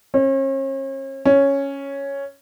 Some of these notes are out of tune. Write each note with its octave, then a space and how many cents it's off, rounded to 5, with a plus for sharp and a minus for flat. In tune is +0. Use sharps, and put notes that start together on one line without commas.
C#4 -40
C#4 +0